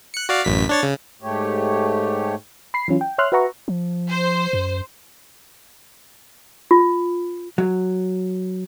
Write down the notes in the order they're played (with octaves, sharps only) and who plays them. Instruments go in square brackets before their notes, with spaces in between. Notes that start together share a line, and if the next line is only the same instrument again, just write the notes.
[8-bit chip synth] F#6 C#7
F#4 D5 F5
A1 F#2 B6
D4 C#5 A6
C#3
[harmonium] G#2 A3 G4 C#5
[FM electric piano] B5 C7
E3 F#3 C#4 F4
G5
C#5 E5 C6 F6 F#6
F#4 B4 E5 F#5 A#5 C#6
[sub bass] F3
[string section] C5
[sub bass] F#2
[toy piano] F4
[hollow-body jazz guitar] F#3